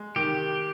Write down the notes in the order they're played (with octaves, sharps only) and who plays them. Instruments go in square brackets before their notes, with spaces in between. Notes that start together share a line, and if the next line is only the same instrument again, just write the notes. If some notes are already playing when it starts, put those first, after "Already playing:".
Already playing: [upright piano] G#3
[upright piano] D#3 [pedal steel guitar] G4